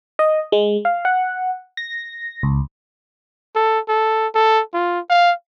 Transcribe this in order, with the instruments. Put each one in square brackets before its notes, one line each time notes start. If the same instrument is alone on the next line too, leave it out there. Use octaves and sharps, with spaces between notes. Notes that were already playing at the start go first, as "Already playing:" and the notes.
[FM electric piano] D#5
G#3
F5
F#5
A#6
C#2
[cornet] A4
A4
A4
F4
F5